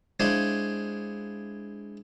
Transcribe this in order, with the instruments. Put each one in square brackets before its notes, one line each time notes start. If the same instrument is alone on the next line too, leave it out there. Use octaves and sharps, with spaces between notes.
[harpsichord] G#3 D4 E4 C5 C#5 F5